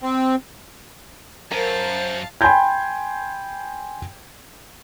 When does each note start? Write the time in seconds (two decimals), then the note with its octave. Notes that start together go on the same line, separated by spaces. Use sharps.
0.03 C4
1.51 F#2 A#4 C5 F5 A5
2.41 G5 G#5 B5 C6 G6 G#6